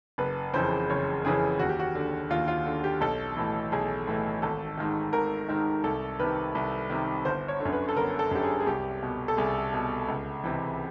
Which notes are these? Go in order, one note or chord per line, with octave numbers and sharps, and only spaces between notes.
F#1 B4
F2 C#3 E3 C5
F#1 C#5
F2 C#3 E3 G#4
D#2 F#4
G4
F#4
D3
D#2 F4
F4
D3
G4
B1 A4
A2 E3
B1 G#4
A2 E3
G#1 A4
G#2 D#3
G#1 A#4
G#2 D#3
C2 A4
C3 D#3 B4
C2
C3 D#3
G1 C5
C#5
D3
F#2
B4
A4
G1 A#4
A4
F#2 D3 G4
G#4
G#4
C2 G4
B2
A4
C2 G#4
B2
C#2
C3 E3